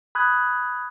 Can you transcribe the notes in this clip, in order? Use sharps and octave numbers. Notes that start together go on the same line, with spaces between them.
B5 D#6 F#6 G#6